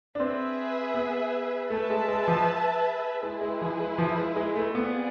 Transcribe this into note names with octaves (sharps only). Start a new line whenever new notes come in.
D4
C4 G#4 B4 E5
B3
A3 G#4 B4 E5 A5
G#3
G#3
F3
G#3 E4 G#4 B4
G#3
F3
G#3
F3
G#3
G#3
A3
B3 C4 F4 G#4 D5